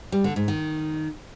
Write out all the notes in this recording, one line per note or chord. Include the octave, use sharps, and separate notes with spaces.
G3
D3
G#2
D#3